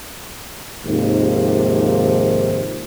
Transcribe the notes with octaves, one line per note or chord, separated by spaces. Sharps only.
D#2 G#2 C3 D#3 F3